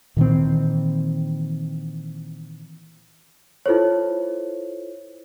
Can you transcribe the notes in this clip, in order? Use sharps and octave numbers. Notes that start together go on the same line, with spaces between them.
A#2 D#3 E3 C4
E4 F4 A4 C5 C#5